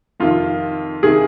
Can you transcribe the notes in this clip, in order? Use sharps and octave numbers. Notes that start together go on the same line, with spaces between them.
F2 C3 D#3 F4
C3 D#3 G#4